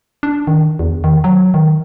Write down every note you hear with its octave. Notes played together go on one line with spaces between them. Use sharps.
D4
D#3
E2
D#3
F#3
D#3